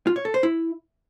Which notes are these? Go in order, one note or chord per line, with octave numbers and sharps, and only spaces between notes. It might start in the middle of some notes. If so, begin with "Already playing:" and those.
F4
C#5
A4
C5
E4